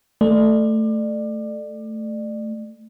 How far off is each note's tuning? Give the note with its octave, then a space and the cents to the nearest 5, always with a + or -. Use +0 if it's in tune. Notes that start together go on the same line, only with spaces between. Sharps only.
A3 +0 D5 +30